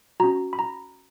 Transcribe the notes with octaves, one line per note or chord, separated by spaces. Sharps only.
C#4 F#4 A#5
B5
A#5